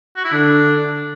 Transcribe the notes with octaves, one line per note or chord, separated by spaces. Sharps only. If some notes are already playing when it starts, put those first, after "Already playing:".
F#4
E4
D3 D4